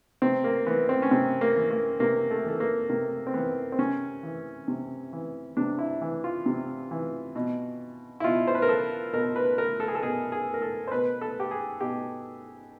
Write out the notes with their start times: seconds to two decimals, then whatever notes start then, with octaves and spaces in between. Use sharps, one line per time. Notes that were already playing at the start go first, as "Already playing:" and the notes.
0.22 C3 C4
0.44 A#3
0.66 E3 B3
0.89 C4
1.02 C#4
1.11 C3 C4
1.41 A#3
1.56 E3
1.71 A#3
2.00 C3 A#3
2.31 A3
2.45 E3 A3
2.60 A#3
2.89 C3 A#3
3.27 C4
3.34 E3 B3
3.72 C4
3.79 C3 C#4
4.23 E3
4.68 C3
5.13 E3
5.57 C3 D4
5.79 E4
6.01 E3
6.24 F4
6.46 C3
6.91 E3
7.35 B2
8.20 E4
8.24 B2 F4
8.47 C5
8.55 B4
8.62 A#4
8.69 A4
9.13 B2 A#4
9.36 B4
9.58 A#4
9.80 A4
9.88 G#4
9.95 A4
10.03 B2 G#4
10.32 G#4
10.54 A#4
10.62 A4
10.87 C5
10.92 B2 B4
11.21 A4
11.40 G4
11.51 G#4
11.81 B2 G4